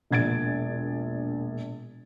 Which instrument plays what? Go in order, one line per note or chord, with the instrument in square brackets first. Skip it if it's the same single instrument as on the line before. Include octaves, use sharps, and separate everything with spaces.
[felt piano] E1 A#1 G#6 A6 D7